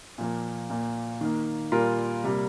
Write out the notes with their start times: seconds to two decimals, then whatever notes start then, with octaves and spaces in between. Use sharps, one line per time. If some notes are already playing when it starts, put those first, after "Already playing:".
0.18 A#2 F3 A#3
0.70 A#2 A#3
1.21 D#3 A#3
1.72 A#2 G3 A#3 F4 A#4
2.24 C3 G3 A#3